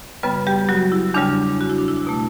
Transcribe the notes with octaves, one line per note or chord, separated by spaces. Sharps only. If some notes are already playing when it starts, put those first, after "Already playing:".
F#2 C#3 G3 B3 B4
G3 G4
F#3 F#4
E4
E2 C#3 G3 D4
F#4
E4
D4
E4
B2 A3